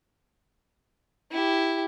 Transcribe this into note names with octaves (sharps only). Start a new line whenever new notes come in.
E4 G4